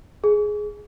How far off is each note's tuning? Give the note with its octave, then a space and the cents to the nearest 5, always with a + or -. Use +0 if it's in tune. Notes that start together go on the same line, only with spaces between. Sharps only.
G#4 +10